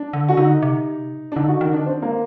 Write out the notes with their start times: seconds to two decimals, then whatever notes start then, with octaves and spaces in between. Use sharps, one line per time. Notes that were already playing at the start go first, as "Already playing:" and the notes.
Already playing: D4
0.13 D3
0.29 F#4
0.37 D3 D#4
0.62 C3
1.32 D4
1.36 D3 D#4
1.48 F#4
1.61 D#3 D#4
1.73 D3 D4
1.85 D#3 C4
2.02 A#3